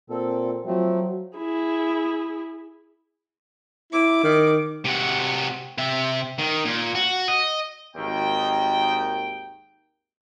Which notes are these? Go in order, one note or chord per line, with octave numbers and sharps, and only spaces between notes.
A#2 C4 A4
F3 F#3 A3 C4
E4 G#4
E4 D6
D#3
C3 F#4
C3 E5
D#3
A#2
F#4
D#5
G#1 D#2 D#4 G5